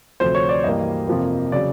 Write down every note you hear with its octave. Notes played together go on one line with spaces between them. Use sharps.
D2 C3 F3 A3 C5
C#5
D5
G2 E3 G3 A#3 D#5
F2 C3 F3 A#3
C#3 F#3 D5